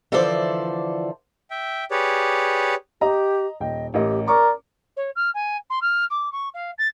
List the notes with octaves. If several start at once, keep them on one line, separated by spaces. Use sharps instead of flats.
D3 E3 F3 A4 C5 D5
E5 G5
G4 G#4 B4 C#5 D5
G4 D#5 A#5
D#1 D#5 G5
A1 G4 A#4 D#5
A#4 D5 C#6 D6
C#5
F6
G#5
C6
F6
D6
C#6
F5
A6